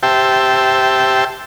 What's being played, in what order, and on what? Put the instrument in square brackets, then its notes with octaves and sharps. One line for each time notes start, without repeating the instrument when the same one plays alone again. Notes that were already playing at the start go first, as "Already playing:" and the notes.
[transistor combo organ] G4 C5 E5 G5 A5